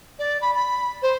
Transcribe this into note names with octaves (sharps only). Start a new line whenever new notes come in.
D5
B5
B5
C5